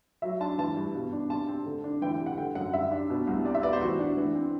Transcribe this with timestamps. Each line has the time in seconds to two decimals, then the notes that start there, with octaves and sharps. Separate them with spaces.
0.22 F#3 E5
0.40 D4 A5
0.58 E3 A5
0.76 G2
0.95 B2
1.13 D4
1.30 C3 A5
1.48 C4
1.66 D3
1.84 D4
2.02 E3 G5
2.14 G5
2.20 C3
2.26 F#5
2.38 D3 G5
2.55 F#2 F#5
2.73 G3 E5
2.91 D4
3.10 B2
3.27 C2
3.45 C3 D5
3.55 E5
3.63 B3 D5
3.73 C5
3.81 E3 F#4
3.99 D4
4.17 E3
4.35 C4